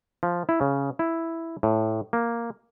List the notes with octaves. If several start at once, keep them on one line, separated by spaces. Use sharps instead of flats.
F3
E4
C#3
E4
A2
A#3